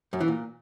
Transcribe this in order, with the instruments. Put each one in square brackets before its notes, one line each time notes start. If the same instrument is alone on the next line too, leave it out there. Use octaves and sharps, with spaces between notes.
[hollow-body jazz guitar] F#2
E3
A#2